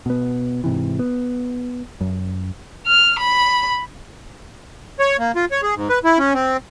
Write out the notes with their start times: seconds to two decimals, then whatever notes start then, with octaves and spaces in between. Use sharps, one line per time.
0.06 B2 B3
0.64 G#2 C3 E3
0.99 B3
2.01 F#2
2.87 F6
3.19 B5
4.99 C#5
5.19 A#3
5.36 F4
5.51 C#5
5.63 G#4
5.76 G#2
5.89 B4
6.04 E4
6.18 C#4
6.34 C4